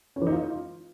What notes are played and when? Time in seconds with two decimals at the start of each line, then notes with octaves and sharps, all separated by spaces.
0.16 C#4
0.21 E3
0.27 D#4
0.32 F4